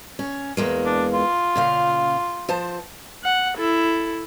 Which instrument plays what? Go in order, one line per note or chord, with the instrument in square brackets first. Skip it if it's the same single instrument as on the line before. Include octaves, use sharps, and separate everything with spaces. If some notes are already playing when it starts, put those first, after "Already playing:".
[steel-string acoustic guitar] C#4
E2 G#3 A#3
[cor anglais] D4
F4
[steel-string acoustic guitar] A#2 C#3 F5
F3 C5 A5
[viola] F#5
E4 A4